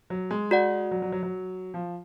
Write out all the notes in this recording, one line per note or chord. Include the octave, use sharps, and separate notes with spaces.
F#3
G#3
F#4 D5 F#5
F#3
F#3
F#3
F#3
F3